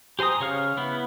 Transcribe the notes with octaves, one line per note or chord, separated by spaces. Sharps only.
G4 C5 G#5 A#5 D#6
C#3 C#5 F5 F6
B3 E4